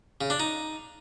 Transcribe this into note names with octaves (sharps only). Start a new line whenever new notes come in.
C#3
D4
D#4